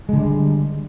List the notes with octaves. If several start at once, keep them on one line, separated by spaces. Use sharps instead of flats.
D3 G3 G#3